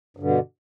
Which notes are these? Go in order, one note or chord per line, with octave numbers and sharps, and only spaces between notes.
G2 B2 D3